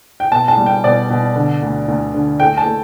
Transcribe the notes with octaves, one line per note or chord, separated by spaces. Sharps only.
G5
B2 A5
A5
G3
G5
B2 D5
B2
D3
D2
D2
D3
A3 G5
A5
A3